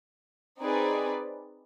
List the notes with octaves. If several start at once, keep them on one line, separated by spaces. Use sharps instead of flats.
C4 D#4 G#4 B4 D5